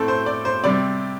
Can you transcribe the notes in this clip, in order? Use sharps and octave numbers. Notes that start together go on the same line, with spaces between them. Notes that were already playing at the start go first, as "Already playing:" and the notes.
Already playing: A2 A3 C4 A4
C5
D5
C5
C3 G3 C4 D5